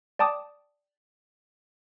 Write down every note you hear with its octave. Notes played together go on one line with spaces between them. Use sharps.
D5 G5 A5 D6 D#6